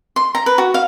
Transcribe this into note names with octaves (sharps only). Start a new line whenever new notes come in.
C6
A#5
B4
F#4
F5